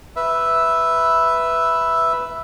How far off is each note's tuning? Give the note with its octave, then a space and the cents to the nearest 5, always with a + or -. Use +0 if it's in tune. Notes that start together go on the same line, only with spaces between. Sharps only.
B4 +0 E5 +0